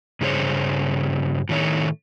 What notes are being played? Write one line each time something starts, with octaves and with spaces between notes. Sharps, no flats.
G2 C#3 G#4 C5 C#5
A2 D#3 A3 C#5